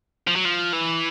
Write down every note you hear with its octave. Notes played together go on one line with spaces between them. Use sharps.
F3
F#3
F3
E3